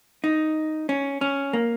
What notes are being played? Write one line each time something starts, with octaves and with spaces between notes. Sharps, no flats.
D#4
C#4
C#4
A#3